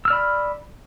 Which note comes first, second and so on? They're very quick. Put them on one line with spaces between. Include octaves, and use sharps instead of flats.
E6 F6 D5 B5